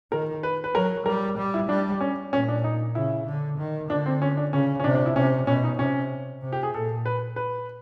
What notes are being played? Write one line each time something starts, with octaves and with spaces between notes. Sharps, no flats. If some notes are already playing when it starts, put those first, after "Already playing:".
D#3 A#4
B4
B4
F#3 A#4
G3 A#4
G3
E4
G3 D4
C#4
A#2 C#4
D4
D#4
C#3 E4
D3
D#3
D3 D4
C4
C#4
D4
C#3 C#4
C#4
C3 D4
D4
E4
C3 C#4
B2 C#4
D#4
C3 C#4
C3
G4
G#4
A#2 A4
B4
B4